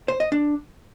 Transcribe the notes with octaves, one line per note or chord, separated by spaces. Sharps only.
C5
D#5
D4